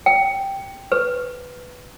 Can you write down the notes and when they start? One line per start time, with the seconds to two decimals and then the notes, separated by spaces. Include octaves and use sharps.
0.06 G5
0.92 B4